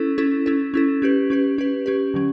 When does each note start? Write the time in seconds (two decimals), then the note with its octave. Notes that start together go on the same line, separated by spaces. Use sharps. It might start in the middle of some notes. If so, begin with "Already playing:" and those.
Already playing: C#4 E4 A4
0.18 C#4 E4 A4
0.46 C#4 E4 A4
0.74 C#4 E4 A4
1.02 C#4 G4 B4
1.30 C#4 G4 B4
1.58 C#4 G4 B4
1.86 C#4 G4 B4
2.14 D3 F#3 C#4